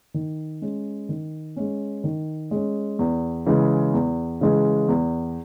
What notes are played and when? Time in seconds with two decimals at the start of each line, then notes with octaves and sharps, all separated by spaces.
0.14 D#3
0.62 G#3 C#4
1.09 D#3
1.56 G#3 C#4
2.04 D#3
2.51 G#3 C#4
2.99 E2
3.46 C#3 E3 G#3
3.94 E2
4.41 C#3 E3 G#3
4.88 E2